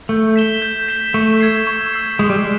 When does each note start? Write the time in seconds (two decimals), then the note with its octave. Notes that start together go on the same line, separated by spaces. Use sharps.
0.09 A3 G6
0.36 B6 E7 G7
0.62 G6
0.88 B6 E7 G7
1.14 A3 C#6
1.40 E6 G#6 C7
1.67 C#6
1.93 E6 G#6 C7
2.19 G#3 C#6
2.30 G3
2.39 G#3